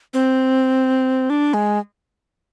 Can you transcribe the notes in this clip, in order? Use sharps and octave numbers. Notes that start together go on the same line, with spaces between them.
C4
D4
G#3